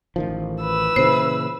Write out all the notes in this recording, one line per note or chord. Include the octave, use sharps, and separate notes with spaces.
A1 D#3 F3
B4 E6
A#2 C#3 E3 C5